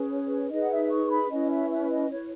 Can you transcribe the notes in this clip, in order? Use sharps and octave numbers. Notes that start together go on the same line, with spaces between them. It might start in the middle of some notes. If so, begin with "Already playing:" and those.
Already playing: C#4 G#4 B4
C#5
C#5
D#4 G#4 B4 D#5
F#5
E5
C#6
B5
C#4 E4 B4 D#5
E5
E5
D#5
E4 B4 C#5